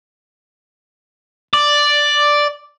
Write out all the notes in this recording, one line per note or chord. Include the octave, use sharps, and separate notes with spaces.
D5